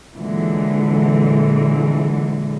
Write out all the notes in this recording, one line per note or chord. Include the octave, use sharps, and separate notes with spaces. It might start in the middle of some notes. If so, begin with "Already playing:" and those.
A#2 D3 E3 F#3 G#3